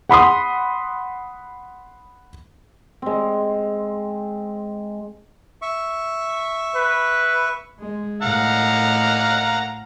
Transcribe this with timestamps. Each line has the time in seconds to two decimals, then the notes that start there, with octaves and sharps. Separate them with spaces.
0.09 F#5 B5 C6 D#6
3.02 G#3 C4
5.62 E5 C#6
6.75 B4
7.80 G#3
8.22 A2 F5 F#5 A#5